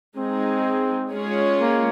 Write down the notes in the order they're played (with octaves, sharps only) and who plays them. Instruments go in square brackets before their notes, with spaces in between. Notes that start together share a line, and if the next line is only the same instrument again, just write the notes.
[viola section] G#3 D#4 G#4 [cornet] C4
[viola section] G#3 C#4 F4 G#4 C#5
[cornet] A#3